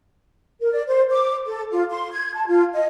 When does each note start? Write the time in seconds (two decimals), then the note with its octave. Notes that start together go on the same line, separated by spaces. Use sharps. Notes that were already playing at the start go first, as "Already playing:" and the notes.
0.60 A#4
0.72 D5
0.88 C5
1.11 D6
1.45 A4
1.71 F4
1.90 C6
2.12 G#6
2.34 A5
2.48 F4
2.73 D#5